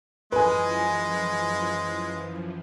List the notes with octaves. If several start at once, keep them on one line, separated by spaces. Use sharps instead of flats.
F#2 E3 F3 G#3 B4 G#5